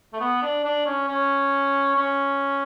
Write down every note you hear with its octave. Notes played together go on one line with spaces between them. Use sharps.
A3
B3
D4
D4
C#4
C#4
C#4